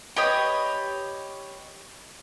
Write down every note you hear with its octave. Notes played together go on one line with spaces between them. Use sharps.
G4 B4 C#5 D#5